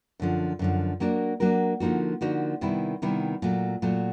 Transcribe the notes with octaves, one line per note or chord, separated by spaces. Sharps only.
F#2 D3 F3
F#2 D3 F3
F#3 A#3 D4 F#4 A#4
F#3 A#3 D4 F#4 A#4
D3 F3 A#3 D#4 F#4
D3 F3 A#3 D#4 F#4
C3 D#3 G3 B3 E4
C3 D#3 G3 B3 E4
A#2 F#3 A3
A#2 F#3 A3